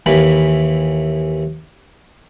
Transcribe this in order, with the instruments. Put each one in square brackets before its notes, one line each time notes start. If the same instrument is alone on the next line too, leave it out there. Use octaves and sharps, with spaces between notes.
[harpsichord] D#2 E3 B5